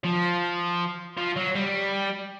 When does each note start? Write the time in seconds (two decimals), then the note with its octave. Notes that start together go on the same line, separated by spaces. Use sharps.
0.04 F3
1.17 F3
1.36 F#3
1.55 G3